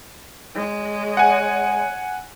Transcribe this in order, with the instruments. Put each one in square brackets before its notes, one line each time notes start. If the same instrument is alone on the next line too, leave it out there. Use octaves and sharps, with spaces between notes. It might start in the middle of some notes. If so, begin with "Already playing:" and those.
[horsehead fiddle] G#3 [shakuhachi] C#5
[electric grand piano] F#5 G#5